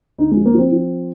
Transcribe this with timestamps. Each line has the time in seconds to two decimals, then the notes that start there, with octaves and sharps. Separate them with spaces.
0.18 D2 D#4
0.31 G#3
0.36 F3
0.45 A#3
0.54 F3 C4
0.72 F3